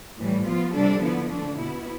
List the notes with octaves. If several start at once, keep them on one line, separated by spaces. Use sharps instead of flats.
A2 E3 G3
F3 B3 F4
C3 G3 D4 A4
D3 F3 B3 E4
D3 A3 D4
B2 B3 E4